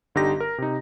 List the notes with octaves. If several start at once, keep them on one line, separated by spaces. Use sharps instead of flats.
G1 D3 D#4 G4 A#6
A#4
C3 D#4